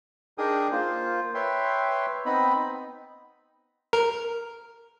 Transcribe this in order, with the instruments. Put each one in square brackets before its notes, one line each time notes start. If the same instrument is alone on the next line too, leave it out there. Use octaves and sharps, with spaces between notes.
[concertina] D4 D#4 G#4 A#4 G5 D#6
A#3 F4 C5
B4 C#5 E5 G5 C6
B3 C4 D#4 D#5 B5
[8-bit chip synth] A#4